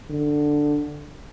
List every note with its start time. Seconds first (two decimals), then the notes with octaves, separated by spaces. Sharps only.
0.10 D3